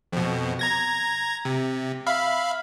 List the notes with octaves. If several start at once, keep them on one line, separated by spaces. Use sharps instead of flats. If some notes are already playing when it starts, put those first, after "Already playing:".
F2 B2
A#5 G#6 A#6
C3
E5 F5 B5